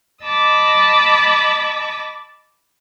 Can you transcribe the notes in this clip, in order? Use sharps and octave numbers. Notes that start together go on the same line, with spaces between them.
D#5 A5 B5 D6 E6